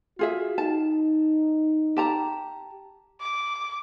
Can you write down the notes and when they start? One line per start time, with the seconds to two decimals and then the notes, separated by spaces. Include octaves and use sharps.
0.19 F4 F#4 G#4 E5
0.58 D#4 A5
1.97 G4 A5 A#5
3.21 D6